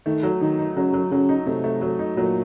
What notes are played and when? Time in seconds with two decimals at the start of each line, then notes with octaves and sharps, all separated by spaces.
0.06 D#3 A3
0.23 F#3
0.41 D#3 D#4
0.59 D#4
0.76 C#3 F#3
0.93 F#3
1.11 C#3 F#3
1.29 D#4
1.46 C3 A3
1.64 A3
1.81 F#3
1.99 D#4
2.17 A#2 F#3